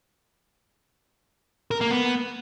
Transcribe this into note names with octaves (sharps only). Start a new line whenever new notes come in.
A#4
A#3
B3